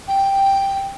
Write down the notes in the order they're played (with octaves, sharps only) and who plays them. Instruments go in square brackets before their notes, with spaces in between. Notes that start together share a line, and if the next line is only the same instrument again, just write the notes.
[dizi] G5